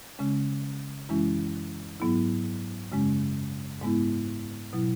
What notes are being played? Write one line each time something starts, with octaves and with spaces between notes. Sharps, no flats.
C#3 G#3 C#4
F#2 E3 G#3 C#4 E4
G#2 F#3 B3 E4
F#2 C#3 G#3 C#4
G#2 G#3 B3 E4
B2 F#3 E4